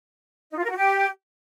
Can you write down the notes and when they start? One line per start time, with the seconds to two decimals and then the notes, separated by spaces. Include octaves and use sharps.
0.51 D#4
0.57 F4
0.64 A#4
0.70 F#4
0.77 G4